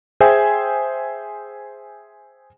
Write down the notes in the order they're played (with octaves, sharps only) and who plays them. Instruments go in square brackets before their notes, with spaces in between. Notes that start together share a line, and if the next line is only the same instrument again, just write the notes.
[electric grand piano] G#4 C5 E5 G5 G#5